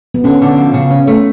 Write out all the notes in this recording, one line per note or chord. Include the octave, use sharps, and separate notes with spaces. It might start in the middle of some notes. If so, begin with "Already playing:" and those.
B3
D3 C#4
D3
F3
C#3
C#4
A3